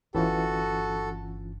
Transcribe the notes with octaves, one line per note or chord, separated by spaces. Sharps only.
G1 E3 C#4 F4 F#4 A4